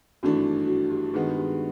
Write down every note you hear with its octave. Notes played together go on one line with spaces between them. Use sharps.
G#1 G2 E3 A3 D4 F#4
F#4
G4
G2 D#3 G#3 B3 G#4
G4